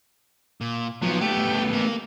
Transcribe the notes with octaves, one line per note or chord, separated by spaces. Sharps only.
A#2
F3 F#3 B3
A3 B3 G4
A#3